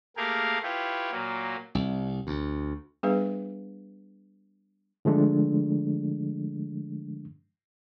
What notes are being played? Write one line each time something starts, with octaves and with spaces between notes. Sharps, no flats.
A3 A#3 G4 G#4 A#4 F5
E4 F4 G4 B4 C#5
A#2 F#3 A#3
C2
D2
G3 B3 D4 G#4 B4 F5
D3 F3 G#3 A3 D4